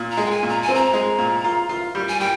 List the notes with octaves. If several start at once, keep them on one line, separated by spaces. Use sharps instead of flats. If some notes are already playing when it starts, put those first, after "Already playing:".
Already playing: A#2
A#5
G#3
G5
G#5
A#2
A#5
G#5
C4
A#5
G#3
A#2
F4
F4
G3
G#5
G3 G5